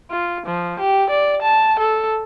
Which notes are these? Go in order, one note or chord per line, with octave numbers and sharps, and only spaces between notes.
F4
F3
G4
D5
A5
A4